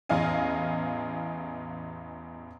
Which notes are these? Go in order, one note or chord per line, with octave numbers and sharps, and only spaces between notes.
A1 E2 D#5 F5 G#5